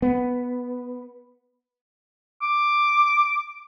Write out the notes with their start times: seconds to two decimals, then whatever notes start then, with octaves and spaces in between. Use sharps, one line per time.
0.02 B3
2.42 D6